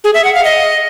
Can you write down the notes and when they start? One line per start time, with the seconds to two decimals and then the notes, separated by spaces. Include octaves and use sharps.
0.04 G#4
0.14 E5
0.24 F#5
0.35 F5
0.45 D#5